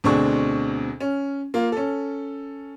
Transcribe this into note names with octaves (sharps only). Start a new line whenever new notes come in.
D2 B2 C4 D4 G#4 C#6
C#4
A#3 F4
C#4 A4